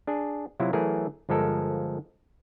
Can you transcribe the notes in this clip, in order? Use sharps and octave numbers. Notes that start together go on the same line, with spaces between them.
D4 G#4
C3 F#3 E4 F4
E3 F#3 A3 G#4 A#4
G1 F3 G#3 A4 A#4